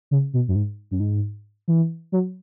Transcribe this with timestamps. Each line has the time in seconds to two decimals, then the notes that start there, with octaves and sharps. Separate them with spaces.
0.11 C#3
0.34 B2
0.48 F#2
0.55 G#2
0.91 F#2
1.00 G#2
1.68 E3
2.12 F#3